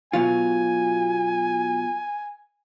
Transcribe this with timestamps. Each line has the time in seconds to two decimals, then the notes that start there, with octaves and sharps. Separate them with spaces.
0.13 B2 F#3 F4 G#5